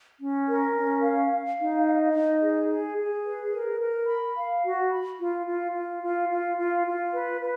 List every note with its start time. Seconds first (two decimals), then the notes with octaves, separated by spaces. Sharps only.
0.20 C#4
0.48 A#4
0.75 C#4
1.03 F5
1.31 F5
1.59 D#4
1.86 D#5
2.13 D#4
2.41 G#4
2.69 G#4
2.97 G#4
3.25 B4
3.52 A#4
3.80 A#4
4.08 B5
4.36 F5
4.64 F#4
4.90 B5
5.19 F4
5.46 F4
5.74 F4
6.03 F4
6.30 F4
6.57 F4
6.85 F4
7.13 B4
7.41 B4